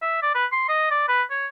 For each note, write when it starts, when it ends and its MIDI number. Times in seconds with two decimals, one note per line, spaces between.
0.02 0.21 76
0.22 0.34 74
0.35 0.46 71
0.53 0.67 84
0.69 0.89 75
0.91 1.04 74
1.08 1.23 71
1.30 1.47 73